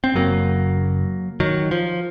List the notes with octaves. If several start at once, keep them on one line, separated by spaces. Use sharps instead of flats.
C4
F#1 F#2 C#3 F#3 A#3
D#3 F#3
F3